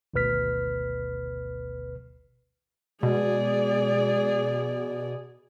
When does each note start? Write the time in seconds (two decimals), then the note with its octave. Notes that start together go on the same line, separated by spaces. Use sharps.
0.14 G#1 D2 B2 B4 F6 B6
3.03 B2 G#3 G#4 D5